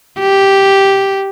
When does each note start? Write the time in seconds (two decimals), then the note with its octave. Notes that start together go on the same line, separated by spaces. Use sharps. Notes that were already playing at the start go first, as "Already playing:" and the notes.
0.20 G4